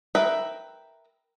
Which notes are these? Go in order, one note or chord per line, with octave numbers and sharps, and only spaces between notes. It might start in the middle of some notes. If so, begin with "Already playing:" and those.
A#4 B4 E5 G5